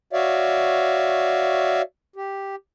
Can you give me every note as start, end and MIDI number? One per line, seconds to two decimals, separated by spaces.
0.13 1.82 66
0.13 1.82 73
0.13 1.82 74
0.13 1.82 76
0.13 1.82 77
2.16 2.56 67